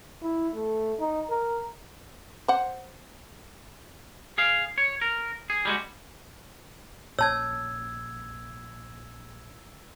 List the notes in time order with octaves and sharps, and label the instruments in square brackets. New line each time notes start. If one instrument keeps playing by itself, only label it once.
[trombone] E4
A3
D#4
A#4
[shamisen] C5 F#5
[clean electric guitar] G#4 F5
C#5
A#4
G#4
G3 G#3 F#4
[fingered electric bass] A#1 A#2 C#4 [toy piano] C#5 A5 [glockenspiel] E6 G#6